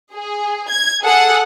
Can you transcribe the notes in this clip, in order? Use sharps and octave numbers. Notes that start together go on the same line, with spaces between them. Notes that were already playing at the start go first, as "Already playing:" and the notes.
G#4
G#6
G#4 A4 F#5